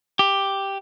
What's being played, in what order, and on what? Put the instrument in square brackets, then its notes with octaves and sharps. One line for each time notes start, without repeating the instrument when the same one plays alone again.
[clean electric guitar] G4